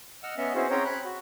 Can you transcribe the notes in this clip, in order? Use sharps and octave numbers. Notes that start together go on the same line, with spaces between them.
D#5 F#5 E6 F6
B3 C#4 D#5 E5 F#5
C4 C#4 E4 F#4 G#4 C5
C4 C#4 G#4 C#5 G5 A#5
B5 F#6
F#4